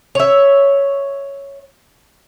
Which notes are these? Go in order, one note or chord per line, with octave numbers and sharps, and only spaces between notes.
C#5 E5